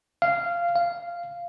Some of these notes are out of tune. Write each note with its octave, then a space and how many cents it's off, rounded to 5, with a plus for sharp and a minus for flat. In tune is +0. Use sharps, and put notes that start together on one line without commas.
F5 -15
F5 -10